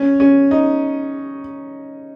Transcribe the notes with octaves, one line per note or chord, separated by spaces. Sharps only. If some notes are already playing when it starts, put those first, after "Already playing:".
Already playing: C#4
C#4
D#4